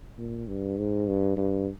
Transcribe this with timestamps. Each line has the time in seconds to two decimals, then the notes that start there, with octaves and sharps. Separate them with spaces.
0.18 A#2
0.48 G2
0.78 G#2
1.07 G2
1.37 G2